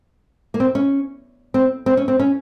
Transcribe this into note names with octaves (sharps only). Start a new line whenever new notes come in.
A#3
C4
C#4
C4
C4
C#4
C4
C#4